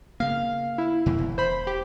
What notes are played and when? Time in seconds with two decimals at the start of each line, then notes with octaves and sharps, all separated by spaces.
0.20 C#3 A#3 F5
0.78 E4
1.06 F2 B2 D3
1.19 E1
1.38 C5 B5
1.67 G4